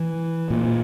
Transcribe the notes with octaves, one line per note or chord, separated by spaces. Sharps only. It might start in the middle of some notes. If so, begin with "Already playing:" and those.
Already playing: E3
A#2